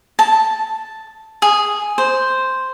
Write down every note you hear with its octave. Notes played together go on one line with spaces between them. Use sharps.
A5
G#4
C5